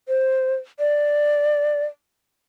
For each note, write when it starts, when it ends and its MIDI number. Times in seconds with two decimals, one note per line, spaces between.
0.08 0.54 72
0.79 1.85 74